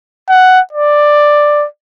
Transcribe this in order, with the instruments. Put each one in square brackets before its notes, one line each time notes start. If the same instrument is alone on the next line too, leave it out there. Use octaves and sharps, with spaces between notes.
[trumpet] F#5
D5